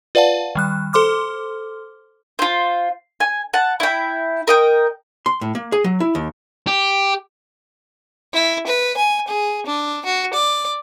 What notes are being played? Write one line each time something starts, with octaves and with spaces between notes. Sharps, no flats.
F4 B4 D5 F5 F#5 A5
D#3 G3 F#6
A4 C5 C6 D6 F6
F4 C5
G#5
F#5 A5
E4 G5
A#4 D#5 G5
C6
A2
A#3
G#4
F#3
E4
D#2
G4
E4
B4
G#5
G#4
D4
F#4
D5